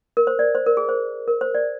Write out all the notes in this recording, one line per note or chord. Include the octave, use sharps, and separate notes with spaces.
A#4
C5
D5
C5
A#4
G#4
C5
A#4
C5
D5